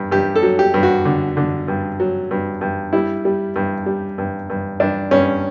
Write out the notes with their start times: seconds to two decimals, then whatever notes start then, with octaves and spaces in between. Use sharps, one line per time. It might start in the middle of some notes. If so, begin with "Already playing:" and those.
Already playing: G2
0.11 G2 G4
0.36 A4
0.43 F#3
0.59 G4
0.74 G2
0.83 F#4
1.05 D3
1.37 D3
1.68 G2
2.00 F#3
2.31 G2
2.61 G2
2.93 G3 E4
3.25 G3
3.56 G2
3.86 G3
4.18 G2
4.50 G2
4.80 G2 D4
5.11 G2 C#4